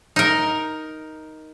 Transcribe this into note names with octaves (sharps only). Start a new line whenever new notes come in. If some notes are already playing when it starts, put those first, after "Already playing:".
D#4 A#4